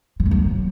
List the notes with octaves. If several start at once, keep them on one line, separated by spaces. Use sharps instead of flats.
F3
G3
F#3